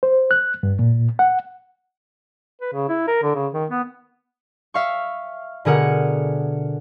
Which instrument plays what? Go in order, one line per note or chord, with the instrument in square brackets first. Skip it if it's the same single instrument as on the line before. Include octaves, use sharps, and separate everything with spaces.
[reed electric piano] C5
F#6
G2
A#2
F#5
[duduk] B4
C#3
E4
A#4
D3
C#3
D#3
B3
[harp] E5 F5 C#6
B2 D3 G#4 A#4 F#5